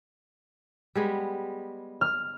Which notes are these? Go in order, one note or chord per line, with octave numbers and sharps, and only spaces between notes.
G3 G#3 B3
F6